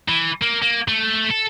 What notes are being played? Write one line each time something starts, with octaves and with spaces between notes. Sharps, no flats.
E3
A#3
A#3
A3
A4